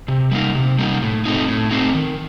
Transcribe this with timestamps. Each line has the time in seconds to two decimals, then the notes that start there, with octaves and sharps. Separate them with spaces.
0.08 C3
0.31 G3 A#3 D#4
0.55 C3
0.79 G3 A#3 D#4
1.02 A2
1.25 A3 C4 D#4
1.48 A2
1.71 A3 C4 D#4
1.95 D#3